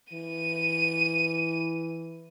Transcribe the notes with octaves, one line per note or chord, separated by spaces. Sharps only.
E3 D#7